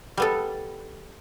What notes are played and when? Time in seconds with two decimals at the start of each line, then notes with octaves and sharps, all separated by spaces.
0.17 G3 B3 A4